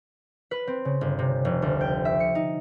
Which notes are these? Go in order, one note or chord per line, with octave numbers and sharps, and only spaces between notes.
B4
C4
C#3
G1
C3
F1
D2
G5
E5
C#7
D#4